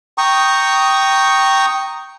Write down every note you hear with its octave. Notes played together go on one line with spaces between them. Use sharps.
G5 A#5 C#6 D#6